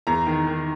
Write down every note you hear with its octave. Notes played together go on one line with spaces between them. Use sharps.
E2 A#5
D#3
D#3